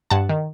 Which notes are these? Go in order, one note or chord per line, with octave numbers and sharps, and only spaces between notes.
G2 F#5 A5
D#3